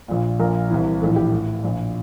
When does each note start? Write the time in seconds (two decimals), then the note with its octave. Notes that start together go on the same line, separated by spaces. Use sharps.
0.08 A#1 A#2
0.40 A#1 A#2 A#4
0.70 C2 C3 E3
1.01 A#1 A2 E3 A4
1.16 G4
1.32 A1 A2 E3
1.63 A#1 A#2